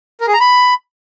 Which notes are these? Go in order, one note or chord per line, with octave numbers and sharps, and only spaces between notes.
A#4
G#4
A#5
B5